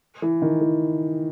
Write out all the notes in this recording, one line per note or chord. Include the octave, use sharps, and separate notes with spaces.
E3
D#3
E3